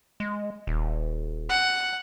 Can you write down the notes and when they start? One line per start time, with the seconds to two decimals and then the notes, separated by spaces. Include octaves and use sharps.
0.20 G#3
0.67 D#1
1.49 F#5